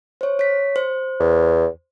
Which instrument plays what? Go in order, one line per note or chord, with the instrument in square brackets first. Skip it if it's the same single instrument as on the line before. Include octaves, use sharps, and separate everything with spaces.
[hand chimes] C5 C#5
C#5 B6
C5
[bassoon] E2